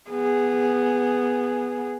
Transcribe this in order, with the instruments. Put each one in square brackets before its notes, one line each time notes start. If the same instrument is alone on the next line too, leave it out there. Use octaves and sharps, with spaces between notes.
[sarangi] B3 [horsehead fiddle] G#4